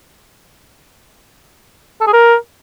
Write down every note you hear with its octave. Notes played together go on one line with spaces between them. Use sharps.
A4
G#4
A#4